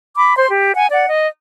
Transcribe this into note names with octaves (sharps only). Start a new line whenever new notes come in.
B5 D6
C5 C6
G4
F#5 G#5
D5 F#5
D#5